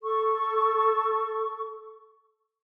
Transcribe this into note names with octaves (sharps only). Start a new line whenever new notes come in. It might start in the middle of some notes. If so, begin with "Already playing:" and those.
A4 C#6